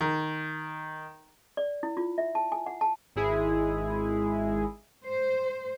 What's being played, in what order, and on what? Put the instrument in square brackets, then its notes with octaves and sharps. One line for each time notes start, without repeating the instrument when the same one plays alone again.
[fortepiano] D#3
[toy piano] D5
E4
F4
E5
A5
G#5
F#5
A5
[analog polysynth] G#1 G#3 E4 G#4
[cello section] C5